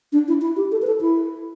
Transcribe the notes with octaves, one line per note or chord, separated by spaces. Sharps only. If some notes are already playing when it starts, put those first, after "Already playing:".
D4
E4
E4
G4
A4
B4
A4
E4